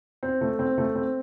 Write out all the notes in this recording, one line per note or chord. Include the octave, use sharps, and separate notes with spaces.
C4
A3
C4
A3
C4